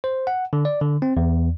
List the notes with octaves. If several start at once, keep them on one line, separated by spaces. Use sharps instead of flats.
C5
F#5
D3
D5
D3
C4
E2